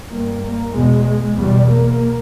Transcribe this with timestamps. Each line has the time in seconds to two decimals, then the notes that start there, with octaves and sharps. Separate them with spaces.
0.11 G2 A#3
0.43 A#3
0.74 E2 B2 G#3
1.37 E2 B2 G3
1.69 A#3